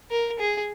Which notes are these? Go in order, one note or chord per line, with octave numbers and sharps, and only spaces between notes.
A#4
G#4